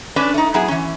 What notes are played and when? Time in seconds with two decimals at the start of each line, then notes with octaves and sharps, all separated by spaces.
0.16 C#4 D4 B4
0.34 A3 D#4
0.54 F#3 B3 E4 G#4
0.68 E3 C#4